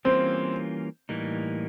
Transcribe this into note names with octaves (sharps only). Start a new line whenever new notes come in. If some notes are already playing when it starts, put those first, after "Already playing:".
E3 G3 A#3 C4 C#4 F4
A2 E3 G3 A#3 D#4